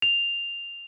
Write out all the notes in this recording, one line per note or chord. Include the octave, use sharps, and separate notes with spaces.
F7